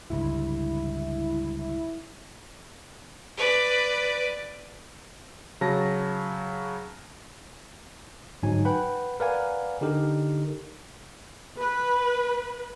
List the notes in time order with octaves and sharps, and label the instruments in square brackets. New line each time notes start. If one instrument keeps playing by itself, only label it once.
[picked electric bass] G1 C#2 G2 [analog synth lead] E4
[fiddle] B4 D5
[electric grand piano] C#3 F#3 A5 A#6
[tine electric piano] G1 G#2 F#3 D#4 G#5
B4 F#5 G5 B5
A#4 B4 D5 F5 F#5 G#5
D3 D#4 G4 A#4
[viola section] B4